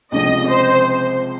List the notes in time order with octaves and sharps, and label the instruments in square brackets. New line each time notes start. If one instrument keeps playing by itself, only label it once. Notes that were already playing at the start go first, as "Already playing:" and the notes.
[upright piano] C#2 C3 F3 [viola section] D#5
[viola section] C5